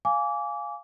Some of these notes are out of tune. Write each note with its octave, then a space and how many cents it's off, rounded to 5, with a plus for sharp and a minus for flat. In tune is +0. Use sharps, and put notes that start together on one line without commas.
F5 +0 G#5 +0 D6 -25